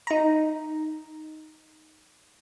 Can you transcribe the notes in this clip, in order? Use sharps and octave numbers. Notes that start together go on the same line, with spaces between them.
D#4 A#5